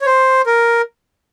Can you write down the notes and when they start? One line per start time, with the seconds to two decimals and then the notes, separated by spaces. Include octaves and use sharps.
0.01 C#5
0.06 C5
0.46 A#4